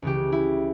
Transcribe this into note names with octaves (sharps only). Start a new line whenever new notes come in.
C#2 C#3 E3 G4
E4